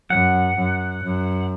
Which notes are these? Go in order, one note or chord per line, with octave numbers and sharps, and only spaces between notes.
F#2 F#5
F#2
F#2